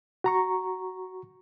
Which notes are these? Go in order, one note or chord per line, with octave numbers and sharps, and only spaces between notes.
F#4 A#5 C#6